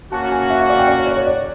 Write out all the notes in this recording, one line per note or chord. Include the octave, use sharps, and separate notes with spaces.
A#3 C#4 F#4 A5
G#5
E5
F5
D5
G5
D5
C#5
D5
C#5
D5